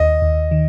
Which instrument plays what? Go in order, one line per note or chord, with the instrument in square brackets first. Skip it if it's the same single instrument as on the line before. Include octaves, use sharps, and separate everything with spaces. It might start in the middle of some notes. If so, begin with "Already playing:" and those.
Already playing: [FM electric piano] D#2 [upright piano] D#5
[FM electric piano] D#2
D#3